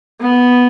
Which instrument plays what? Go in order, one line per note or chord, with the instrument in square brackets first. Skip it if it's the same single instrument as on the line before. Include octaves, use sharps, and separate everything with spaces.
[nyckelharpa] B3